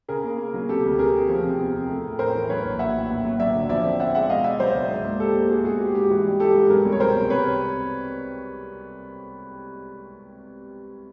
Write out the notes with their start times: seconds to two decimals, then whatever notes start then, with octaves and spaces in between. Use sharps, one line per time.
0.08 C#3 G#4 A#4
0.24 A#3
0.38 A#3
0.54 F#3
0.69 C3 G4 A4
0.84 D2
0.99 C3 G#4 A#4
1.14 C3
1.29 F3
1.44 C3
1.59 E2
1.74 C3
1.89 A3
2.04 A2
2.19 A2 A#4 C5
2.34 E3
2.49 F#3 B4 C#5
2.64 A#1
2.79 A#1 E5 F#5
2.95 A2
3.10 D#2
3.25 F#3
3.39 F#3 D5 E5
3.54 D3
3.69 F3 D5 E5
3.84 C4
4.00 C4 E5 F#5
4.15 G#3 E5 F#5
4.29 B2 D#5 F5
4.44 B2 D5 E5
4.59 F#3 C5 D5
4.75 C#2
4.90 G#2
5.05 A#3
5.20 A#3 G4 A4
5.35 A#3
5.50 G#2 F#4 G#4
5.64 B3 F#4 G#4
5.80 G#3 G4
5.95 G#2 G4
6.10 E3 F#4 G#4
6.25 G3
6.40 G3 G4 A4
6.55 G#2
6.70 F#3 G#4 A#4
6.85 C2
6.92 C#5
7.00 B2 A#4 C5
7.15 C2
7.30 C3 B4 C#5